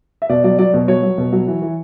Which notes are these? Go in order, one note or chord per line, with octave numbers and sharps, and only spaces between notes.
E5
B2 D5
F#3 D5
F#3 D5
B2
F#3 C#5
F#3
B2
F#3
E3
E3